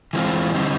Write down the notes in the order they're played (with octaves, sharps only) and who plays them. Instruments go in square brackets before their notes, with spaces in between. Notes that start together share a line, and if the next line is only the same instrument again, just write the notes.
[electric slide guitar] E3 G#3 C4 F4
D3 G3 C4 D#4